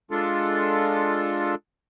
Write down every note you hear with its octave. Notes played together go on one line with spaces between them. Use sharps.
G#3 D4 F4 A4